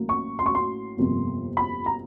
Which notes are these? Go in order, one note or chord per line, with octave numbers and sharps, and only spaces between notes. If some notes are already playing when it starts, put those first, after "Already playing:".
Already playing: A1 A2 F#3 A#3
C#6
C6
C#6
C6
G1 F2 C3 F3 A#3
B5
A#5